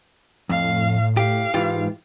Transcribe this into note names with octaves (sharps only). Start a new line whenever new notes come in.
F2 A2 F5
G4 F5
G#2 E3 F4 G4